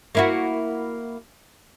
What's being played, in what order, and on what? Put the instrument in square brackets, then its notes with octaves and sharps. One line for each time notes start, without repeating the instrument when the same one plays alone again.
[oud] A#3 E4 F#4